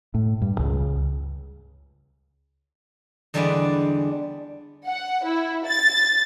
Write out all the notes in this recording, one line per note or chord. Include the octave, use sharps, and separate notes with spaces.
A2
G2
C#2 C#3
E2 D3 G3 G#3 B4 D5
F#5
E4
A6